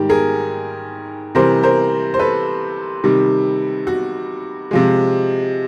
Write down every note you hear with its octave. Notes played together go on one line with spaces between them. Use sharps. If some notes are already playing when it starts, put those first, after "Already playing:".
Already playing: G#2 D#3 G3 G4
G#4 A#4
C3 E3 G3 A#4 C5
A#4 C5
C5
A4 B4
C3 D#3 G3
F#4
C3 F3 G#3